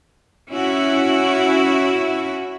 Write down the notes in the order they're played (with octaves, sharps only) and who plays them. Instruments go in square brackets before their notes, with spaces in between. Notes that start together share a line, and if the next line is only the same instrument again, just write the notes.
[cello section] C#4 E4 F#4